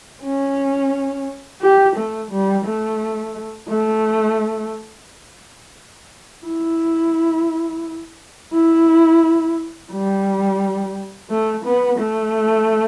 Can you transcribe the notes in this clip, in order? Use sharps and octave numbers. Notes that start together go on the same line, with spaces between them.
C#4
G4
A3
G3
A3
A3
E4
E4
G3
A3
B3
A3